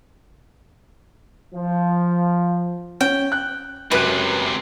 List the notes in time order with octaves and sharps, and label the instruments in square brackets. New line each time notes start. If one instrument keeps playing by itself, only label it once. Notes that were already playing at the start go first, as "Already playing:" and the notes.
[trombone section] F3
[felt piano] C#4 [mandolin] G5
[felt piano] F#6
[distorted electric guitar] C#2 C3 [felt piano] F#2 F#6 [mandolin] B4